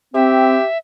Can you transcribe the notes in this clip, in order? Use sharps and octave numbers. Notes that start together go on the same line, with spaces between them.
C4 G4 E5